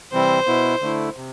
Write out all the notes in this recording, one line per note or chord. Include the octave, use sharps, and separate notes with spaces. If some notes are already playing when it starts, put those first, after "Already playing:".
C3 E3 G3 C4 E4 C5
B2 B3 E4
D3 A3 E4
C3